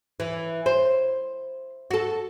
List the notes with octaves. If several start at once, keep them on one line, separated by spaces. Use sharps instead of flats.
E3
C5
F#4 A4